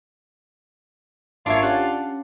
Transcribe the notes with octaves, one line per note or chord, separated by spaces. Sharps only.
G#1 D4 F4 A#4 C#5 E5 C#6 G#6
C#4 G4 F5 F#5